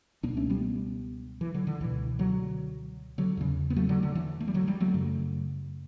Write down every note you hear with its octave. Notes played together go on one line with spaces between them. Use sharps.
C#2 B2 B3 D4
A3 C#4
G3 B3
E3
D3 F#3
D3
C#2 B2 E3
D3 F#3
D3 F#3
E2 C#3
B3
F#3 A3
D3 F#3
D3
E3
A3
G3
D3 F#3
E3 G3
F#3 A3
F#2 C#3